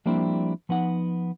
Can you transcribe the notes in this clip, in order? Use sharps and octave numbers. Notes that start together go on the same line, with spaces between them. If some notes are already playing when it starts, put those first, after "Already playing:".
F3 G3 A#3 C4 D4 E4
F3 B3 D#4 F#5